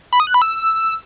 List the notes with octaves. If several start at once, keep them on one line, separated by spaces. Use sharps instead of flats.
B5
D#6
F#6
B5
E6